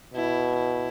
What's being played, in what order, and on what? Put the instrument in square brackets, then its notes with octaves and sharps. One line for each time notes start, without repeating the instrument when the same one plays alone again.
[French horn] B2 [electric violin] E4
[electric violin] E4